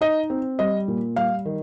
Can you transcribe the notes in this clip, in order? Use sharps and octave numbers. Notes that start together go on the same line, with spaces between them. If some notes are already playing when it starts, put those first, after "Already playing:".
D#4 D#5
C4
G3 D#5
A#2
G3 F5
D#3